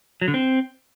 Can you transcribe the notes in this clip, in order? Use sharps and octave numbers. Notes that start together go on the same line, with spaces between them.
F#3
D3
C4